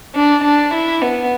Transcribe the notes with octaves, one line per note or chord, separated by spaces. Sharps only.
D4
D4
E4
B3